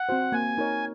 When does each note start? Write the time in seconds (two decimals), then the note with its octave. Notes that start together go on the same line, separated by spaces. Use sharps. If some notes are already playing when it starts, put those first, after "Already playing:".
Already playing: F#5
0.09 C4 F#4 C5
0.32 A#3 G#5
0.58 D#4 A#4 C#5